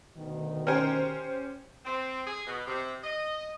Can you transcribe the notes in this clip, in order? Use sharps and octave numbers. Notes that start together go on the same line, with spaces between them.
D2 B2 D#3
C#4 G4 A#4 C5 G#5
C4
G#4
B2
C3
D#5